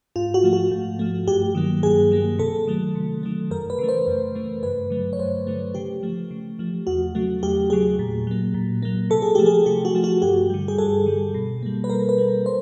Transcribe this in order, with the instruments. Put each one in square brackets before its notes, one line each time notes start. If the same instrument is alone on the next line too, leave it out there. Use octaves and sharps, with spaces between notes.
[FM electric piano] G#2 F4
F#4
F3 A3
F#4
G#2
F3 A3
G2 G4
D#3 F#3 A#3
G2 G#4
D#3 F#3 A#3
C3 A4
D#3 F#3 A3
C3
D#3 F#3 A3
F#2 A#4
B4
C#3 E3 A3
C5
F#2
C#3 E3 A3
G2 B4
D3 F#3 A3
C#5
G2 C5
D3 F#3 A3
C#3 G4
F3 A3
C#3
F3 A3
E2 F#4
C#3 F#3 A3
E2 G4
C#3 F#3 A3 G#4
A#2
F#3 A#3
A#2
F#3 A#3
C3 A4
G#4
F3 A3 G4
G#4
C3 G4
F#4
F3 A3
F#4
G2 G4
D3 G3
G#4
G2 A4
D3 G3
B2
G3 A#3
B4
B2 A#4
B4
G3 A#3
C5